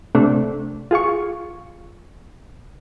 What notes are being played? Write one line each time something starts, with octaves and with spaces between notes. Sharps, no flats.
C3 A3 D4
F4 G#4 F5 C#6